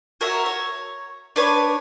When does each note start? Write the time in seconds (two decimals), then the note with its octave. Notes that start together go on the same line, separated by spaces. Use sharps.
0.21 F#4 A#4 C#5 E5
0.46 C#5
1.36 D4 B4 C#5